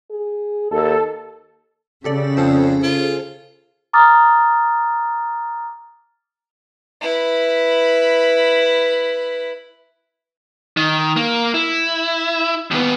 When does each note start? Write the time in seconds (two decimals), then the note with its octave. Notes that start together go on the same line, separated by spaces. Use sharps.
0.10 G#4
0.71 D#2 A4
2.04 C#3 G4 A4 D5
2.37 F2 G#4 A4 C5
2.83 F4
3.93 A#5 D6 D#6 F6 A6
7.01 E4 B4
10.77 D#3
11.16 A#3
11.54 E4
12.71 D#2 B3